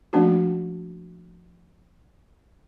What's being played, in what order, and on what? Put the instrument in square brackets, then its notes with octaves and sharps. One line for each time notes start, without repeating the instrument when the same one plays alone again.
[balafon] F3 A3 A#3 C#4 D4 F#4